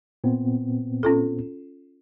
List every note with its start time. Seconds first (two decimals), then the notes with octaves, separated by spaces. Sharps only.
0.24 A#2 B3 C4
1.03 C#4 F4 A4